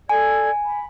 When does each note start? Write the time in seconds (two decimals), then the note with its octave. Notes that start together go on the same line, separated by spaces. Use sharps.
0.09 A4 D5 G#5 G#6
0.64 B5